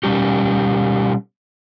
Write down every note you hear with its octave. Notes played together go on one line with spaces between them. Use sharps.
B2 G3 C#4 G4